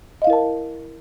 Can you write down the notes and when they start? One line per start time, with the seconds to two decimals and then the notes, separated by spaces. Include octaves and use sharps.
0.22 D#5
0.24 F5
0.27 E4
0.30 A#4
0.33 A5